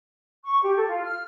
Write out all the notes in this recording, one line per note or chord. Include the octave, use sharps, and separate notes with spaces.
C#6
G4
A4
F4
F6